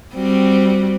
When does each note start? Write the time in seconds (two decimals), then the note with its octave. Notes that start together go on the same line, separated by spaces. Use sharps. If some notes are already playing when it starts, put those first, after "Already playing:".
0.15 G3 C4 F#4